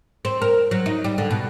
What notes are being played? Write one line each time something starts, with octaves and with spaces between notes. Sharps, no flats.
C4
A#4
F#3
D#4
G3
D3
B2